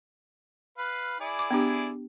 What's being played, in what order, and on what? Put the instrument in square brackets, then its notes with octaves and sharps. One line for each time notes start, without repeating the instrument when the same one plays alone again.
[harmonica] B4 F5
E4 G#4 D5
[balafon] D6
B3 D4 G4